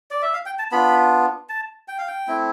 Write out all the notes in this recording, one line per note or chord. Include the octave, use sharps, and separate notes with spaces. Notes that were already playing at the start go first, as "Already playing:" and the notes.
D5
E5
F5
G5
A5
B3 D4 F4 B5
A5
G5
F5
G5
A3 C4 E4